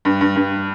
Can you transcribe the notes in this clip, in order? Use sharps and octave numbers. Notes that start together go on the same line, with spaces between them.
G2
G2
G2